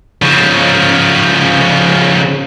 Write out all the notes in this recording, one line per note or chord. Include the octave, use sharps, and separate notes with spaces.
C#3 F3